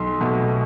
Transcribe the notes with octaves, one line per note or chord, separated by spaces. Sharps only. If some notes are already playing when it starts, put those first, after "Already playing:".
Already playing: B1 C6
B2 A3